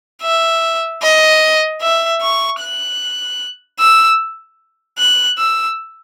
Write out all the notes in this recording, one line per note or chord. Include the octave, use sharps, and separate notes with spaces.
E5
D#5
E5
C#6
F#6
E6
F#6
E6